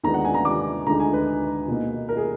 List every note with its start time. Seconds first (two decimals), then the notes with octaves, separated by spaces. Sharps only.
0.04 D#2 D3 G#3 B3 A#5
0.14 F#5
0.25 G#5
0.34 A#5
0.45 D6
0.86 D2 D3 G#3 D#4 A#5
1.00 G#5
1.13 B4
1.68 B2 A#3 D#4
2.09 A#4
2.17 G#4